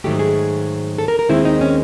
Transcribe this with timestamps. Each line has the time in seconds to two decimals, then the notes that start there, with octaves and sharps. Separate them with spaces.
0.04 G#2 D#3 F#3 A3 G4
0.19 G#4
0.98 A4
1.08 A#4
1.19 A#4
1.29 D#2 D#3 G#3 C4 E4
1.45 D#4
1.61 C#4